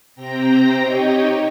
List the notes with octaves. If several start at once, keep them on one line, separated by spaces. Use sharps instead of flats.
C3 C4 G5 A#5 A#6
D#4 G4 C#5 D#5